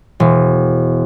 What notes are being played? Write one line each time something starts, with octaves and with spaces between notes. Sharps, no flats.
E1